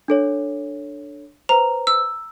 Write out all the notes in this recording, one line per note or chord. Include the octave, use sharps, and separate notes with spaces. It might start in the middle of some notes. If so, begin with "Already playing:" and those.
D4 A4 C#5
B4 C5 A#5
E6